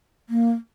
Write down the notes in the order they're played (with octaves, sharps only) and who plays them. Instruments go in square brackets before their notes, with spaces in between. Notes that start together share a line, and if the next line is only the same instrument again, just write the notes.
[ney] A#3